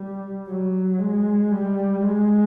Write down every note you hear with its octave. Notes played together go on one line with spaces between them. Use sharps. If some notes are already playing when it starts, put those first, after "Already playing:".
Already playing: G3
F#3
G#3
G3
G#3